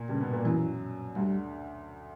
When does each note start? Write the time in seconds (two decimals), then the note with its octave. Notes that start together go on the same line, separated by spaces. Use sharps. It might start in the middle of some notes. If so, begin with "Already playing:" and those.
Already playing: A#2 A#3
0.09 G2 C#3 G3
0.21 B2 B3
0.33 A#2 A#3
0.45 F#2 E3 F#3
1.16 D2 D3 G3